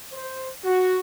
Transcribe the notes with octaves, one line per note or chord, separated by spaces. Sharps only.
C5
F#4